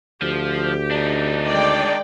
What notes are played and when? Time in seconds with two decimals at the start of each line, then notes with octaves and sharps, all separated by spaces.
0.22 D2 F3 G4
0.91 D4 D#4
1.46 D#3 G#3 D5 G5